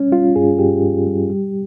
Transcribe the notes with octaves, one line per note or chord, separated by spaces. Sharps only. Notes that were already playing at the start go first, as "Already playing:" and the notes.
Already playing: G3 C#4
G3 F4
G2 G#4
G2 G4
G2
G3
G3